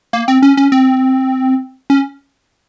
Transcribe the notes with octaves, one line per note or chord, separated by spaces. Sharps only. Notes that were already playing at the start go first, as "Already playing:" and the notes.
A#3
C4
C#4
C#4
C4
C#4